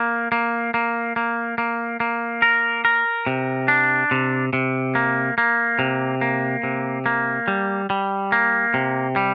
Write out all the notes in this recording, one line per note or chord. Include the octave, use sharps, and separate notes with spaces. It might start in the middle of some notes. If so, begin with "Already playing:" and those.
Already playing: A#3
A#3
A#3
A#3
A#3
A#3
A#4
A#4
C3
D4
C3
C3
A#3
A#3
C3
A#3
C3
A#3
G3
G3
A#3
C3
G3